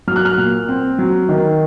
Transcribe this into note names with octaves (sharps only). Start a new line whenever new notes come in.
F#3 F6
F#6
F6
A#2
C4
F#3
D#3